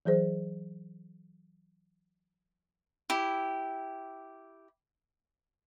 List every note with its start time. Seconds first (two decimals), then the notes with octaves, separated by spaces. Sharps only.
0.05 E3 F#3 G#4 C5
3.10 E4 G4